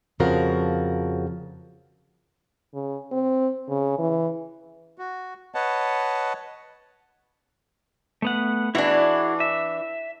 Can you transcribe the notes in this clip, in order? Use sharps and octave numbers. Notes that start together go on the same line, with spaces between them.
F2 C#3 F3 F#4 A#4
C#3
C4
C#3
E3
F#4
B4 C#5 D#5 F#5 A5
A3 B3 F#5
E3 D4 E4 F#4 G#4
E5